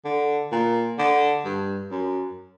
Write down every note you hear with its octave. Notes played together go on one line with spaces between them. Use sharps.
D3
A#2
D3
G2
F#2